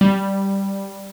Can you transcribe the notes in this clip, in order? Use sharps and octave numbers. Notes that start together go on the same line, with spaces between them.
G3